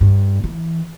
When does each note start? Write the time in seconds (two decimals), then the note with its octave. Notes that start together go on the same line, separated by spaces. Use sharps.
0.01 G2
0.44 E3